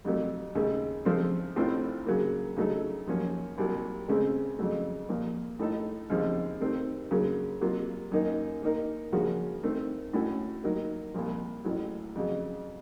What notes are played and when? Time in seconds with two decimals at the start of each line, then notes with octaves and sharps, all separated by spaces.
0.05 F2 C3 F#3 A3
0.55 D#2 C#3 A3
1.05 C#3 F3 A3 C4
1.56 A1 A2 A3 C4 F4
2.06 C#3 F#3 A#3
2.57 C#3 F#3 A3 D#4 A4
3.07 F#2 F3 A#3 C#4
3.58 C2 C3 F#3 A#3
4.08 C#2 C#3 A3 C4
4.59 F2 C#3 F#3 A3
5.09 A#2 F3 A#3
5.59 A2 A3 D#4 A4
6.10 D#2 C#3 F3 C4
6.60 C3 D#3 A3 C4
7.11 F#2 C#3 F#3 A#3
7.61 C3 F#3 A#3 F4
8.12 F#2 D#3 A#3 D#4
8.62 D#3 A#3 D#4 A#4
9.12 C#3 F3 A#3 C#4 F#4
9.63 D#3 A3 C4
10.13 A2 A3 C#4 F#4
10.63 D#3 F#3 A#3 D#4 A#4
11.14 C2 A#2 F3
11.64 A1 A2 F#3
12.15 F2 C#3 F#3